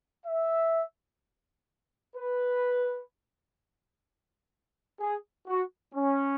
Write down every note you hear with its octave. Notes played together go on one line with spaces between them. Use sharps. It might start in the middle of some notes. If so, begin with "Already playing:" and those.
E5
B4
G#4
F#4
C#4